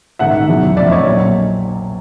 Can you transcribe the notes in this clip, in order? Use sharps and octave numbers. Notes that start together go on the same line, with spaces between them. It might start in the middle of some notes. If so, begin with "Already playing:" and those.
A#1 G#2 D#3 E5 F#5
E2 B2 F#3
F1 F2 D3 F3 D5 E5
C#5 D#5
A#1 A#2 F#3